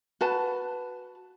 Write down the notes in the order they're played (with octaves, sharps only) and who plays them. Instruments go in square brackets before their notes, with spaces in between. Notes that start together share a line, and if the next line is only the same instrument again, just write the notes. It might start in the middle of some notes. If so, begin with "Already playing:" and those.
[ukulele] F#4 B4 A5